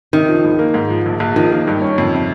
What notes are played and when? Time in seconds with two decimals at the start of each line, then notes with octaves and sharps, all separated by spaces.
0.13 C3 D#3
0.28 F3
0.44 C#2
0.59 A#3
0.74 G#2
0.90 F3
1.06 A#1
1.20 A#1
1.36 D#3 F3
1.52 A#3
1.67 G2
1.82 C#4
1.98 F2
2.14 C3